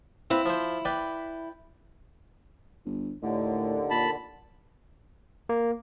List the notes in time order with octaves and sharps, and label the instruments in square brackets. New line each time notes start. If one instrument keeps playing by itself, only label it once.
[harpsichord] C4 B4 F5 [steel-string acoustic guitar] E4
[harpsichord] F3 C5
B4 D5 G5
[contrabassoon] G1
[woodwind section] D#2 D3 [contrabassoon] A2
[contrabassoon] A#2 [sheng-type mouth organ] A5 B5
[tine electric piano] A#3